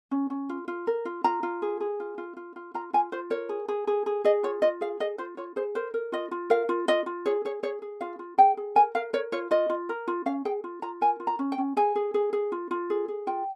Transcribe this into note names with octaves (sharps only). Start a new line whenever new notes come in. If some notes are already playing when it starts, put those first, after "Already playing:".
C#4
C#4
F4
F4
A#4
F4
F4 A#5
F4
G#4
G#4
F4
F4
F4
F4
F4 A#5
F4 G#5
F4 C5
A#4 C#5
G#4
G#4
G#4
G#4
G#4 D#5
F4 C#5
F4 D#5
G#4 F5
G#4 D#5
F4 C5
F4 C#5
G#4 C5
A#4 C5
A#4
F4 D#5
F4
A#4 F5
F4
F4 D#5
F4
G#4 C#5
G#4 C#5
G#4 C#5
G#4
F4 F5
F4
G#4 G5
G#4
A#4 G#5
A#4 F5
A#4 C#5
F4 C#5
F4 D#5
F4
A#4
F4
C#4 F5
G#4 G5
F4
F4 A#5
A#4 G#5
F4
A#5
C#4
G5
C#4
G#4 G#5
G#4
G#4
G#4
F4
F4
G#4
G#4
F4 G5